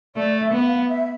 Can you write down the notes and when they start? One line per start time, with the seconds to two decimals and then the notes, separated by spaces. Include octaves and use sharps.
0.16 A3 D5
0.40 E5
0.53 B3
0.65 F5
0.89 E5